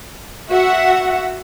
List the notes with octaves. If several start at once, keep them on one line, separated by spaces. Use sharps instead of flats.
F#4 E5 F#5